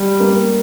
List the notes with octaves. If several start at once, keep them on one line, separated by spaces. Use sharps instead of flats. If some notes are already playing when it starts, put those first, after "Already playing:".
Already playing: G3
A#3